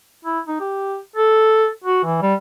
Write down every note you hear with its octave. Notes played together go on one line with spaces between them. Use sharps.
E4
D#4
G4
A4
F#4
E3
G3